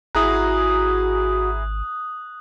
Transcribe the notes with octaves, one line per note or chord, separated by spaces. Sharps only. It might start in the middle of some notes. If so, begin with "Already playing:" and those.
G#1 E4 F#4 G#4 A#5 D#6 F#6